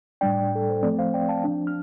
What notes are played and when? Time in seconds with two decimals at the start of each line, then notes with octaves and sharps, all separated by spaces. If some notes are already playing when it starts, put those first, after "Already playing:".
0.21 A2 G3 D4 D5 G5
0.55 A4
0.70 C5
0.83 F3 A3 C4 A4 D5
0.99 C5 F5
1.14 D5 G5
1.29 F5 A5
1.44 F3 D4
1.67 F6